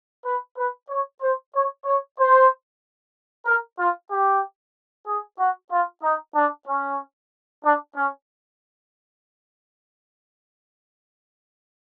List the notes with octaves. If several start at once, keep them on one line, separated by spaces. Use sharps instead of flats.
B4
B4
C#5
C5
C#5
C#5
C5
A#4
F4
G4
G#4
F#4
F4
D#4
D4
C#4
D4
C#4